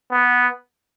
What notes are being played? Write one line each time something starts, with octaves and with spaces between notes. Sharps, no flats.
B3